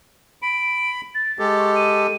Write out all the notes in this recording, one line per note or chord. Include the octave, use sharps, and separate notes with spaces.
B5 D7
A6
G#3 G4 A4
C#6
D#7